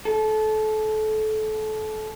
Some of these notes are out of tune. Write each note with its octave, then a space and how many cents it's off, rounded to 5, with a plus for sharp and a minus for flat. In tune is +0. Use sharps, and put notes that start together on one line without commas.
A4 -25